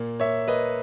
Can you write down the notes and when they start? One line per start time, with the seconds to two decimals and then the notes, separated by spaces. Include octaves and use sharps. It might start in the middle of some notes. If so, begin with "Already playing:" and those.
Already playing: A#2 A#3
0.20 A#3 C#5 E5
0.48 A#3 B4 D#5